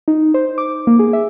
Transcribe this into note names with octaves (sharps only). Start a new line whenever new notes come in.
D#4
C5
D6
A#3
G#4
E5